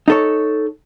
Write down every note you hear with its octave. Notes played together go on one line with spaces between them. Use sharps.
D#4 A4 C#5